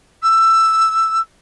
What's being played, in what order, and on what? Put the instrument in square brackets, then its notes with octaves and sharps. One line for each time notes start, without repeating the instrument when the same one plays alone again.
[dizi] E6